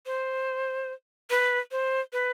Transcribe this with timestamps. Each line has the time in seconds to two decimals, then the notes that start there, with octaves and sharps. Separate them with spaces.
0.06 C5
1.30 B4
1.71 C5
2.13 B4